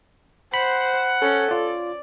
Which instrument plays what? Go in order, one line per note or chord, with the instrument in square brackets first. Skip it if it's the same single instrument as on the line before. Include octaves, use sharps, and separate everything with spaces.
[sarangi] C5 [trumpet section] F#5 [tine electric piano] B5
[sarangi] C#4 [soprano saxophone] A4
[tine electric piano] F4 [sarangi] D5